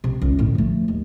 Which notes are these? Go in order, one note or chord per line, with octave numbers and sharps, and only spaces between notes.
C3
C#2 D#3
A2 D3
F3 A3
D#2